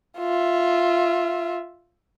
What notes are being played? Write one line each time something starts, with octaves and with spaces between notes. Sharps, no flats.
F4 E5